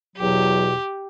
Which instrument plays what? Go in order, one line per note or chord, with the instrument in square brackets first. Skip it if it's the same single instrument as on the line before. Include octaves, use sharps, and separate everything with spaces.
[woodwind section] E2 B2 F#3 [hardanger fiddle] G4